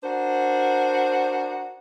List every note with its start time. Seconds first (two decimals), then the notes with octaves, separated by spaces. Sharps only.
0.03 D4 F#4 A#4 C5